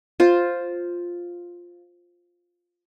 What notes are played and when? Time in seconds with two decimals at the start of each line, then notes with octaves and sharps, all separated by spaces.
0.20 F4 C5